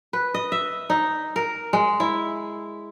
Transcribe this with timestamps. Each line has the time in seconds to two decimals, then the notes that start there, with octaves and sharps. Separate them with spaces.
0.13 B4
0.34 D#5
0.52 E5
0.90 D#4
1.36 A#4
1.73 G#3
2.00 E4